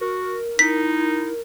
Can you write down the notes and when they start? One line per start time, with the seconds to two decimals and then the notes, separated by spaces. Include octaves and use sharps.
0.01 F#4 A#4
0.59 D#4 E4 B6